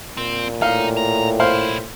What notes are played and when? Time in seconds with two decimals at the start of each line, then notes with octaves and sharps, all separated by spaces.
0.17 A#2 C4
0.62 A2 D#4 F5
0.97 A#5
1.40 B1 E4 C5 F5